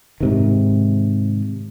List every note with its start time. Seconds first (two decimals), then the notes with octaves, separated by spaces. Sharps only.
0.20 G#2 C3 D#3